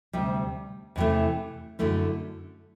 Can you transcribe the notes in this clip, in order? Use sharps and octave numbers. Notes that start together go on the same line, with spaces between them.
D2 C3 G3
E2 C3 E3 A3
F#2 D3 A3 E4